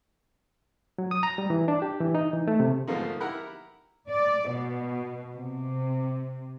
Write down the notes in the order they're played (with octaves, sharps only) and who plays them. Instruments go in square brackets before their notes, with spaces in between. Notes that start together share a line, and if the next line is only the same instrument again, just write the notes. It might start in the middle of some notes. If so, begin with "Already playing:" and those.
[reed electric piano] F#3
D#6
A#5
G3
E3
D4
G4
E3
D#4
E3
A3
C3
[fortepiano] G#2 B2 F3 A3 A#3 D#4
E4 G4 A#4 F#5 B5
[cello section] D5
B2
C3